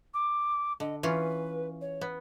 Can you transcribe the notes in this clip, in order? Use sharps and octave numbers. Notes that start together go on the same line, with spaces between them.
D6
D3 D#5
E3 C#4 F4 B4
C#5
B3